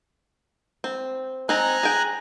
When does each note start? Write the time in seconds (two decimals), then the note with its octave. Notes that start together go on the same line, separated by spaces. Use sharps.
0.84 C4
1.49 C4 D#4 G#5 A#5 F#6
1.83 G#4 G5